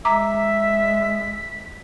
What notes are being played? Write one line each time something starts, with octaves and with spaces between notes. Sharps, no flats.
G#3 E5 A#5 D6 B6